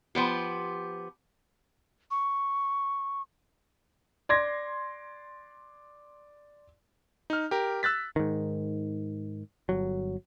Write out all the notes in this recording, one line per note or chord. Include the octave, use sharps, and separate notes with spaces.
F3 B3 G4
C#6
D5 C6 G#6 A#6
D#4 F6
G4 A#4
E6 F#6 A6 B6
G#2 D#3
G1 F#3